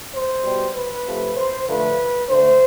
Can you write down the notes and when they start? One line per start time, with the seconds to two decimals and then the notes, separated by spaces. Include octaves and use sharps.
0.13 C5
0.43 B2 G3
0.74 B4
1.05 C3 F3 A3
1.36 C5
1.67 D3 F3 A3 B4
2.29 D3 A3 C5